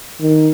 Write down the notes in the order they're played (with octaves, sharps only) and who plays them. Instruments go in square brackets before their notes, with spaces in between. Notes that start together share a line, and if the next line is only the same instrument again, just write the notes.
[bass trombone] D#3